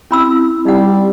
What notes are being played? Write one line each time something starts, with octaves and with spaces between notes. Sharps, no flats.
C4 C#4 E4 B5 E6
G3 D#4 F#5